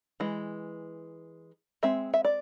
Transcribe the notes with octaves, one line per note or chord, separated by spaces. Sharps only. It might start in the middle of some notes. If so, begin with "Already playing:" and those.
E3 G#3
G#3 C4 E5
E5
D5